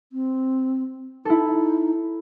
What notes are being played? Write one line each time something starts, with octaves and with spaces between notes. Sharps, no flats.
C4
D#4 E4 A4